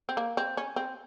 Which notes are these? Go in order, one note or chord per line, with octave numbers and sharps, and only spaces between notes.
C4
A#3
C4
C#4
C4